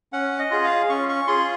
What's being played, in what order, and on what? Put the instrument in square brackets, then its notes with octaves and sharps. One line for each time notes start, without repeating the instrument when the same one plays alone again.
[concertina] C#4 F#5
D#5
F4 G#4
F5
C#4 C#6
C#6
F4 G#4 C6